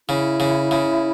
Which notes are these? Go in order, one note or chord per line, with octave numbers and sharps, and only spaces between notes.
C#3 E4
C#3
C#3